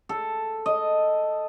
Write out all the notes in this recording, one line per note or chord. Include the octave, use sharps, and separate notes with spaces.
A4
D#5